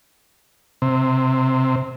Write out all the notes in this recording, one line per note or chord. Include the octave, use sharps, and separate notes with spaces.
C3